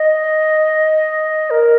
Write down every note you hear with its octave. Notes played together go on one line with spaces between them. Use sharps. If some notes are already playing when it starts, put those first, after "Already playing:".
Already playing: D#5
A#4